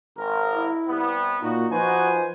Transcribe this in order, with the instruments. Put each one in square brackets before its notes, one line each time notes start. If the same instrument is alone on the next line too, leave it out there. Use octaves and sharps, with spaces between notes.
[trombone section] G#1 A#4
[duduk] E4
[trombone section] C3 G3 B3
[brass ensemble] A#2 F#4 [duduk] D#4
[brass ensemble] F3 C5 G#5 [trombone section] D#4 F#4 [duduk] B4